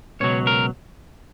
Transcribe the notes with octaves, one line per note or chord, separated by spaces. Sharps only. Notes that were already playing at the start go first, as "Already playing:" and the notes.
C#2 B2 F#3 C#5
A#4